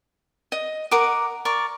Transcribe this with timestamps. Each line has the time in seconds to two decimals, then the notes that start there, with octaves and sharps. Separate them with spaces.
0.52 D#5
0.91 A#4 F#5 D6 D#6
1.45 A#4 D5 C#6